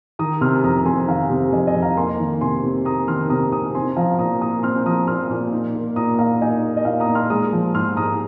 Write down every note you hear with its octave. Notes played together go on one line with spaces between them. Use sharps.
D#3 A#5 D#6
C3 C6 F6
F2 A#5 D#6
F2 G#5 C6
D#3 F5 A#5
C3
F2 D#5 G#5
D#5 G#5
F2
F5 A#5
A#3 G#5 C6
D#3
C3 G#5 C6
C3
A#3 A#5 D#6
D#3 C6 F6
C3 A#5 D#6
C3 A#5 D#6
C4 G#5 C6
F3 F5 A#5
A#2 A#5 D#6
A#2 A#5 D#6
C4 C6 F6
F3 A#5 D#6
A#2 C6 F6
A#2
D#4
A#3
A#2 A#5 D#6
A#2 F5 A#5
D#4 D#5 G#5
A#3
D#5
A#2 F5
A#5 D#6
A#2
C6 F6
G#3 A#5 D#6
F3
G#2 C6 F6
G#2 A#5 D#6